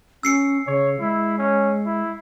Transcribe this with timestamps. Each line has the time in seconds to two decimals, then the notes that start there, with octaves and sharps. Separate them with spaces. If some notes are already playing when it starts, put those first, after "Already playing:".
0.23 C#4 E6 C7 C#7
0.67 C#3 C#5
1.00 G#3 E4
1.39 C#4
1.86 E4